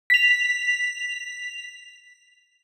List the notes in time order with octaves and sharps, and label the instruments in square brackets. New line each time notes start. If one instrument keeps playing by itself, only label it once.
[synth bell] B6 F7